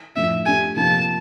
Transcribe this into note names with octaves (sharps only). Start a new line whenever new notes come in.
A2 F3 A3 D4 E5
A3 D4 G4 G#5
C3 F3 A#3 D#4 G4 A5